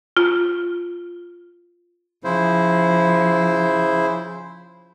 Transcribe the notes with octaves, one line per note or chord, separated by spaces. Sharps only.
F4
C#3 F3 E4 C5